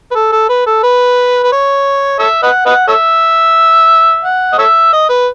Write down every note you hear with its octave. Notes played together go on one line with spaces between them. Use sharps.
B4
A4
A4
B4
A4
B4
B4
C#5
A4 C#5 E5
B4 D#5 F#5
B4 D#5 F#5
A4 C#5 E5
F#5
D#5
A4 C#5 E5
D#5
B4